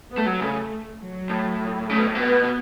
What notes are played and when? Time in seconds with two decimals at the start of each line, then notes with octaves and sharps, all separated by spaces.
0.11 B3
0.18 A3
0.26 F#3
0.40 C#3 A3
1.01 F#3
1.30 A2
1.90 C#3 A3
1.98 B2
2.07 A2
2.15 B2 B3
2.43 B2